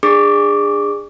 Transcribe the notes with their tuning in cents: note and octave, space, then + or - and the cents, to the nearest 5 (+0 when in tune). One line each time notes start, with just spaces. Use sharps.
D4 +20 G#4 -20 D6 +5